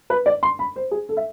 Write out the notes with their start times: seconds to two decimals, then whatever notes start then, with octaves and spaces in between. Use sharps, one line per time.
0.10 B4
0.26 D5
0.43 C6
0.59 B5
0.76 C5
0.91 G#4
1.09 A4
1.17 E5